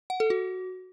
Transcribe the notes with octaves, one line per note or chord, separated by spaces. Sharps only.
F#5
A4
F#4